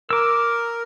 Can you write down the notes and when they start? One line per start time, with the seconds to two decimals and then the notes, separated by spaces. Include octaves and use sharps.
0.10 A#4 D6 E6